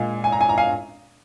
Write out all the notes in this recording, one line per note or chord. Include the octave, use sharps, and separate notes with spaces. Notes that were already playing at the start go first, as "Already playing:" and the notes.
Already playing: A#2 G#3 F5 G#5
G#5
A#5
G#5
A#5
F5 G#5